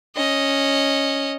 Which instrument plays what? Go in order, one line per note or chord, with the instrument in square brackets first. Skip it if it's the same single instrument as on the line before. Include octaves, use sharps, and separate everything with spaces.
[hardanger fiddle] C#4 D#5